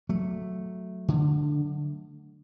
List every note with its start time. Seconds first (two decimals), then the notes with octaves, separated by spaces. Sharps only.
0.09 F#3 A3
1.08 D3